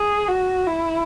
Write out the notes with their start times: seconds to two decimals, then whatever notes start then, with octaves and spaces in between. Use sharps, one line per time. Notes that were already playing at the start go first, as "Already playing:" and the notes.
Already playing: G#4
0.28 F#4
0.67 E4